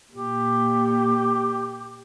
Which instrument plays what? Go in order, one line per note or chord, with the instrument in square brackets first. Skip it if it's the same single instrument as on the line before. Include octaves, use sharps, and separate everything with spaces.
[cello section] A#2 [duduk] G4